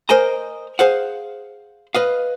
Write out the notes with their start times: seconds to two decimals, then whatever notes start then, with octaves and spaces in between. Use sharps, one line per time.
0.09 A#4 C5 D#5 G#5 A#5
0.79 G#4 C5 F5 F#5
1.95 B4 D#5 F5